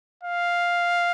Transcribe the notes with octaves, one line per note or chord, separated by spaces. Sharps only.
F5